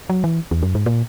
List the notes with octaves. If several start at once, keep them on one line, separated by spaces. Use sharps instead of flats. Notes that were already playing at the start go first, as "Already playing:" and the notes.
F#3
E3
E2
F#2
G#2
A#2